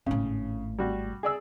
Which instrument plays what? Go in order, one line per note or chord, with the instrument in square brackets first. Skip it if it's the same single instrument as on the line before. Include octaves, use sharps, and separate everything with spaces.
[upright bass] G#1 A2 [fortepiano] C#3
[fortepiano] G3 F#4
G#4 D5 E6